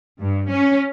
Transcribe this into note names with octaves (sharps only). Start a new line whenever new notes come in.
G2
C#4